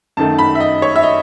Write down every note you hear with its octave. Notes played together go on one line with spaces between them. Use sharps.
F#2 D#3 A3 A5
B5
E5
D#5
C#5
E5
D#5